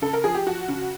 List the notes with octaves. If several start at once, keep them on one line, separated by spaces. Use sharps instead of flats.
C#3 A4
A#4
F3 G#4
G4
F3 F#4
C#3